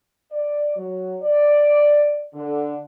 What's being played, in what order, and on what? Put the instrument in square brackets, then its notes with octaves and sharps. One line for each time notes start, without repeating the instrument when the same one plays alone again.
[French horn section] D5
F#3
D5
D3